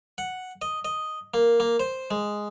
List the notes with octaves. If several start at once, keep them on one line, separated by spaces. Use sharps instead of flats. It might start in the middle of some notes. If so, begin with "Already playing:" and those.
F#5
D#5
D#5
A#3
A#3
C5
G#3